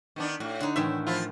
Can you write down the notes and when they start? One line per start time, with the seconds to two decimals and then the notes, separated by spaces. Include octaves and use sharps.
0.16 D#3 B3 D4
0.40 A2 F#4
0.61 D3 D#4
0.76 A2 D#3 E3 E5
1.07 F3 E4 F4